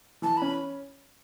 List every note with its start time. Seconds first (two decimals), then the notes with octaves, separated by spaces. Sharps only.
0.22 E3 A5
0.37 C#4 B5